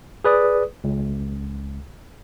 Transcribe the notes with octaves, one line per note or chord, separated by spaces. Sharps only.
G#4 B4 D5 D#6
C#2